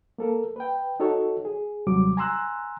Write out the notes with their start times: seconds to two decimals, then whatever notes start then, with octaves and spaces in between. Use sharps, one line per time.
0.18 A#3 A4 A#4
0.56 B4 G5
1.00 D#4 F#4 A4 C#5
1.45 G#4
1.87 D#2 C3 F#3 G3 D6
2.17 G#5 A#5 C6 E6 F#6